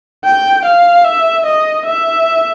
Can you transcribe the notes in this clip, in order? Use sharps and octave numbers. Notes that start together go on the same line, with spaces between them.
G5
F5
E5
D#5
E5